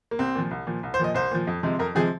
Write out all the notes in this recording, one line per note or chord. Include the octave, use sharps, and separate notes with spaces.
A#3
C2 C4
A#2 F3
C2
A#2 F3
C2
C5
A#2 F3 D#5
C2 C5
A#2 F3
F2
C3 F3 G#3
F2 A#4
C3 F3 G#3 G#4